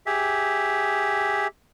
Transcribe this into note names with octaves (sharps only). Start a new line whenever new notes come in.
G4 G#4 E5